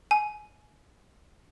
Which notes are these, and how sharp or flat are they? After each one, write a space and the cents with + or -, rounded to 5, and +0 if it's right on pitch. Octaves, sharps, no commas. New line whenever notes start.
G#5 +20